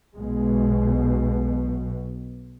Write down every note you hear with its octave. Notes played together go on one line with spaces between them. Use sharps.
B1 B2 G#3